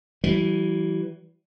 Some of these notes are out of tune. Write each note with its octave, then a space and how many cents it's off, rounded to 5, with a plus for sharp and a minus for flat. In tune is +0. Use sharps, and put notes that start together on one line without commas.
E3 +0 G3 -45